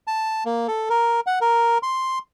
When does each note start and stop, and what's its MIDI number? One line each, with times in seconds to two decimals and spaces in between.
0.07 0.44 81
0.45 0.67 58
0.68 0.89 69
0.89 1.20 70
1.27 1.39 78
1.41 1.78 70
1.83 2.19 84